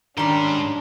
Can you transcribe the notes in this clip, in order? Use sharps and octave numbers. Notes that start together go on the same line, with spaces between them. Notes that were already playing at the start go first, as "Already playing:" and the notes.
G#2 D#3 G3 C#4 D4 G4 C6